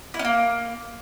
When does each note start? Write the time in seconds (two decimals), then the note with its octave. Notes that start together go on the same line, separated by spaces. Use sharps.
0.14 E4
0.19 C#4
0.25 A#3